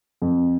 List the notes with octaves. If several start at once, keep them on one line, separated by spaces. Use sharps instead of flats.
F2